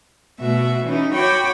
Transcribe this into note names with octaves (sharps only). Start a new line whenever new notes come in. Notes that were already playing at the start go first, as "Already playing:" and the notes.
B2 A3 F#4 E5
E3 C#4 D#4 E4
F#4 C#5 G5 B5 D6